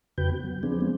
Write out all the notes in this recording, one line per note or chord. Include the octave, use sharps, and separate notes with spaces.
F2 C#3 F#4 B4 G5 G6
B3
F#3
F3 B3 C4 D4 G#4
F3 G#3 C4